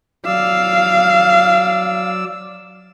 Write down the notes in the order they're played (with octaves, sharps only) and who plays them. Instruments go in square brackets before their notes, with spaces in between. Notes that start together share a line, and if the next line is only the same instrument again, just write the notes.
[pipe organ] F#3 D5 E6 [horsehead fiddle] F5